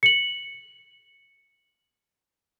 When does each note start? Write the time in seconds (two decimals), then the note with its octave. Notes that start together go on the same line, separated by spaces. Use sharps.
0.03 C#7 F#7